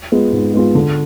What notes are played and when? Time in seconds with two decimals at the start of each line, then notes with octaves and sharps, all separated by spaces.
0.12 G#3 B3 F4 G#4
0.33 G#2
0.54 G#3 B3 F4 G#4
0.75 D3